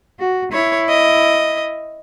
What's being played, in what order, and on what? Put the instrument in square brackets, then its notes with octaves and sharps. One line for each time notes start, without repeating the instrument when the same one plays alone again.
[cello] F#4
[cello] E4 [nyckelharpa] C#5
[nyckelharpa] D#5